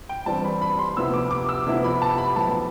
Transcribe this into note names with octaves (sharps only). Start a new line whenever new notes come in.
G5
G1 G2 E3 G3 C4 A5
B5
B5
C6
D2 C3 F3 B3 E4 E6
D6
D6
E6
D2 C3 F3 B3 E4
B5
A5
B5
B1 A2 F3 B3 A5